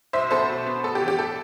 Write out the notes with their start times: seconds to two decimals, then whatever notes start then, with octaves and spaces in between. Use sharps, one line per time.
0.13 B1 C5 E5
0.31 B3 A4 C5
0.48 B2
0.66 B3
0.84 B3 A4
0.95 G4
1.02 E3
1.08 G4
1.19 A4